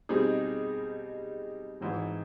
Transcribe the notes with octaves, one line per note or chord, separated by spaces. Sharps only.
B2 G3 C4 D#4 G#4
G#1 G#2 E3